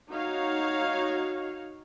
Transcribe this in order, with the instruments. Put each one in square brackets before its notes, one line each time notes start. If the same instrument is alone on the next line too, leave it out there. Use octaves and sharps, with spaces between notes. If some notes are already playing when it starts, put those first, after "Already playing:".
[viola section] D#4 F#4 C#5 F5